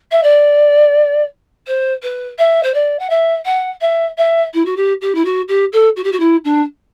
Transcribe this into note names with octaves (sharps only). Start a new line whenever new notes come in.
E5
D5
C5
B4
E5
C5
D5
F#5
E5
F#5
E5
E5
E4
F#4
G4
G4
E4
F#4
G4
A4
F#4
G4
F#4
E4
D4